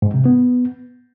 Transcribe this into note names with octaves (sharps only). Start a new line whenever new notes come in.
G#2
C3
B3